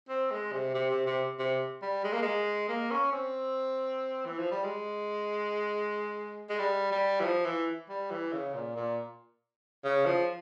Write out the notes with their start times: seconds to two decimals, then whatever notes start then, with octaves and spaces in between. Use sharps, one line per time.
0.09 C4
0.31 G#3
0.52 C3
0.74 C3
0.90 C3
1.06 C3
1.39 C3
1.82 G3
2.04 G#3
2.13 A#3
2.22 G#3
2.69 A#3
2.91 C#4
3.12 C4
4.26 E3
4.38 F3
4.51 G3
4.64 G#3
6.49 G#3
6.59 G3
6.92 G3
7.20 E3
7.24 F3
7.45 E3
7.89 G3
8.11 E3
8.33 C#3
8.54 A#2
8.76 A#2
9.84 C#3
10.06 F3